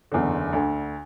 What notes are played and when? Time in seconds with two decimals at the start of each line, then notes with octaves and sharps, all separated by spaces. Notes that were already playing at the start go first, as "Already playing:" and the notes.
0.12 F#1 E2 D3
0.53 D2 D3